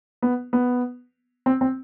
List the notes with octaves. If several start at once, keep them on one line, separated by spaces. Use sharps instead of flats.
B3
B3
C4
C4